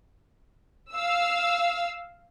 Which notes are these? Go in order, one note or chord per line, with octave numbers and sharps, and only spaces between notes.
F5 E6